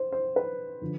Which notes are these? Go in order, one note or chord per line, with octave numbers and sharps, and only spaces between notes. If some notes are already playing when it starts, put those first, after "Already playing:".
Already playing: C5
C5
B4
D3 F3